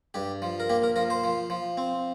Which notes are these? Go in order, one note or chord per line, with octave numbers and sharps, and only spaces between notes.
G2 G4
F3
A#4
A#3 G4
A#4
F3 A#4
C5
F3
F3
C4